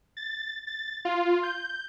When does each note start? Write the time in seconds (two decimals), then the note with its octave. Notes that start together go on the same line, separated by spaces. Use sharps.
0.17 A6
0.67 A6
1.05 F4
1.43 G6